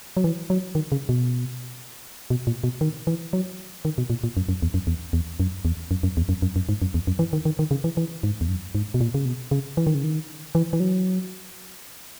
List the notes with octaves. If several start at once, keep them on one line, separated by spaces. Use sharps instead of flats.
F#3
E3
F#3
D#3
C#3
B2
B2
A#2
B2
D#3
E3
F#3
D#3
B2
A#2
A#2
F#2
F#2
E2
F#2
E2
E2
F#2
E2
F#2
F#2
E2
F#2
F#2
F#2
G#2
F#2
E2
F#2
E3
D#3
D#3
D#3
C#3
E3
E3
G#2
E2
F#2
G#2
B2
A#2
C#3
B2
C#3
E3
D#3
C#3
D#3
E3
E3
F#3